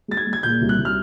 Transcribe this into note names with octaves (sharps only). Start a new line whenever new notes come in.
G#3 A6
G#6
G#3
G#6
A#2 G6
C2
F#6
C2
F6